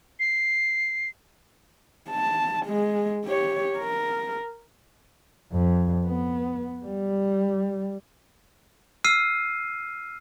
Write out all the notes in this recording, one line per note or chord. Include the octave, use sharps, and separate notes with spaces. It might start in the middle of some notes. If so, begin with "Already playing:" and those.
C7
A5
G#3
G4 C#5
A#4
F2
B3
G3
E6 F6 C7 D#7